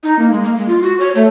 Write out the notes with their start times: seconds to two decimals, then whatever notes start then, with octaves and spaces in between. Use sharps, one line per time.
0.03 D#4
0.19 A#3
0.31 G#3
0.43 A#3
0.57 G#3
0.68 F4
0.83 F#4
1.00 C#5
1.15 A3